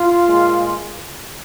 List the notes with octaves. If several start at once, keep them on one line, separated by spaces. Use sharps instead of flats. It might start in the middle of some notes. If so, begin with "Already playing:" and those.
Already playing: F4
A#2 G#3